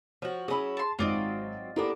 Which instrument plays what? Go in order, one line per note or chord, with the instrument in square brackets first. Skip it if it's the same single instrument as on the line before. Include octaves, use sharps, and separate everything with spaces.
[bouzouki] F3 F#4 [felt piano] C#5
[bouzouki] F#3 C#4 E4 [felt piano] G#4 [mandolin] B5 D#6
[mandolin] A5 C6
[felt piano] G#1 G#2 [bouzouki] F#3 C4 [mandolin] F4 D5 D#5
[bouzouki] A#3 B3 D4 [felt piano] E4 G4 A4